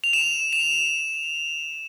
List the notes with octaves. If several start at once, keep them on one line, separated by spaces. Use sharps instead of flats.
F7
E7
E7